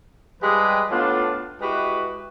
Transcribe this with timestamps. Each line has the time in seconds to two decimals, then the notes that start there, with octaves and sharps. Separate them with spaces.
0.41 F3 G3 G#3 G4 G#4 B4
0.91 A2 B3 D4 F4
1.61 G#3 E4 F#4 G4 B4